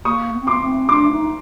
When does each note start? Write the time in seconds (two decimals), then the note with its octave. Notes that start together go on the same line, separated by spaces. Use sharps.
0.05 A#3 C#6 D#6
0.34 B3
0.41 C4
0.47 B3 C6 D6
0.61 C4
0.89 D4 C6 D6
1.10 D#4